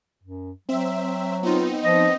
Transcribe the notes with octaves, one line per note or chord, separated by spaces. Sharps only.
F#2
F#3 C4 E5
B3 C4 D#4 F4
F3 D#5